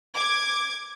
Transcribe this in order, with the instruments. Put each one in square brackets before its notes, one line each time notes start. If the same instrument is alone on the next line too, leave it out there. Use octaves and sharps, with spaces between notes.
[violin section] D6 G#6